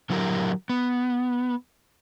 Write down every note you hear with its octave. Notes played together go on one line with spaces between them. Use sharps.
D3 F#3 E4 G4 A#4
B3